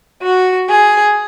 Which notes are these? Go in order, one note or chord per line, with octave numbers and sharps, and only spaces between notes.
F#4
G#4